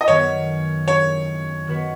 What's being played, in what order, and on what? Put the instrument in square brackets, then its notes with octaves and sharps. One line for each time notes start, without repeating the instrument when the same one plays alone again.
[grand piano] D#5
[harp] F#2 D#3 B3 [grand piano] C#5
[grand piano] C#5
[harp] D#3 B3 F#4 B4